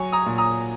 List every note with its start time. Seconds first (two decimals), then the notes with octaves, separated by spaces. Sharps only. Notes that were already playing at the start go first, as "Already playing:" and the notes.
Already playing: F#3 G#5 C#6
0.12 A#5 D#6
0.26 A#2
0.38 A#5 D#6